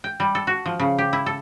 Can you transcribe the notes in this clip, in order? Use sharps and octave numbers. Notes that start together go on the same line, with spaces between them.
G5
G3
A4
F#4
F3
C#3
G4
E4
A4